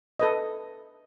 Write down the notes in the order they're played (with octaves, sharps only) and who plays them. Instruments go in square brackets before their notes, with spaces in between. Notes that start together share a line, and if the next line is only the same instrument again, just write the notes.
[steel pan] A4 B4 D#5